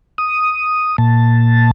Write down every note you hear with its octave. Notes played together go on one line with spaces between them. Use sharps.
D#6
A#2 A5